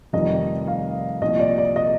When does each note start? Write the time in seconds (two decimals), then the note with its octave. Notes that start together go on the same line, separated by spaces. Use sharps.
0.13 F1 F2 D#3 G3 D#5
0.68 F5
1.21 C2 A#2 F3 D#5
1.40 D5
1.58 D5
1.76 D#5